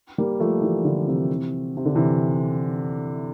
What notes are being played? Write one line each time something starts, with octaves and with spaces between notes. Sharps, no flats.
G3 A#3
F3 A3
E3 G3
D3 F3
C3 E3
C3
D3
C3 E3